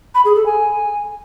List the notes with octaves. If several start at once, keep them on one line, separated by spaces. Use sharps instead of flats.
B5
G#4
A4
G#5